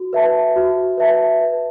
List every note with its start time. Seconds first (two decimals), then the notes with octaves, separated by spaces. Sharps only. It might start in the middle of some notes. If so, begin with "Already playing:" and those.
Already playing: F#4
0.13 B4 E5 A5
0.56 F#4
0.98 B4 E5 A5
1.40 B4